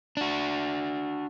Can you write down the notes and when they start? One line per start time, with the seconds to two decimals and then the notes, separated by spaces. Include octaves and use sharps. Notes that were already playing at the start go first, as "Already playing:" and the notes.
0.17 D4 F#4